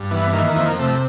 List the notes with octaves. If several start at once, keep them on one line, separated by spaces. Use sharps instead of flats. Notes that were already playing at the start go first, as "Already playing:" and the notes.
Already playing: G2
E3 B3
D#3 A#3
F2 A#3
C3 A3